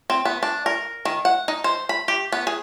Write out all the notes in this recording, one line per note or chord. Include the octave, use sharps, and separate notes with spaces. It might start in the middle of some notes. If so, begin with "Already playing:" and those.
C4
B3
D4
A#4
D#3
F#5
D#4
C5
B5
G4
B3
G#4